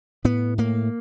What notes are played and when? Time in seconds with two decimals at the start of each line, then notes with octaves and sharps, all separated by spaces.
0.24 A2 B3
0.58 A2 A#3